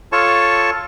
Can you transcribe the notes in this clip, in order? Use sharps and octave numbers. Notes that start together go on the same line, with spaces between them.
F4 A4 C#5 A5 C#6